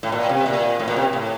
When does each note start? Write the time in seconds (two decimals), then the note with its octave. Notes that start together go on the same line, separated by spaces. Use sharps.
0.03 A2
0.12 A#2
0.29 C3
0.46 A#2
0.80 A2
0.88 A#2
0.96 C3
1.13 A2